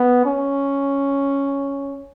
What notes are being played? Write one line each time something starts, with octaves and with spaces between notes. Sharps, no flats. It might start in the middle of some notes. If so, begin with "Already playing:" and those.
Already playing: B3
C#4